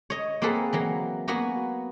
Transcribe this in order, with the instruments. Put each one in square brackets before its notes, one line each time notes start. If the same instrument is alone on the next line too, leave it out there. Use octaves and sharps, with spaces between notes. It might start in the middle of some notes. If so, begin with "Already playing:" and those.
[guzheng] C#5 D#5
A#3 C4 G#4 A4 B4 F#5
E3 F#3 A#3
A#3 B3 F#4 B4 F#5 G#5